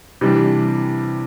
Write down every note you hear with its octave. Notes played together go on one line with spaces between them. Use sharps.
C3 E3 G3 D4